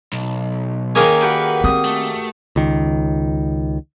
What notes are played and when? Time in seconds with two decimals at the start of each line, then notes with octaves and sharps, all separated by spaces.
0.13 B1
0.95 D#3 A#3 C#4 G#4 A#4
1.22 F#4 G4 B4
1.64 C4 D#6
1.85 A3
2.56 C#2 D#3